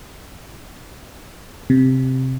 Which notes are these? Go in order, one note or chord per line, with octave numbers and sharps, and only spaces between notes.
C3